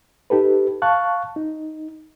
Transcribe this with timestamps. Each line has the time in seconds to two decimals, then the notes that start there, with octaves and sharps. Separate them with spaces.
0.30 D#4 G4 A4 B4
0.82 F5 A5 C#6 F#6
1.36 D#4